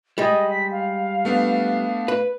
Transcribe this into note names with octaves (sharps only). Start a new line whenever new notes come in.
G3 G#3 D#5
B6
F5
A3 B3 D4
B4